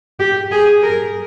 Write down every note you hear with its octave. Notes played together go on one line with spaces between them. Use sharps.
G4
G#4
A#4